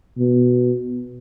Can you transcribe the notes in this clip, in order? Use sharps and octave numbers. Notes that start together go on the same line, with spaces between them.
B2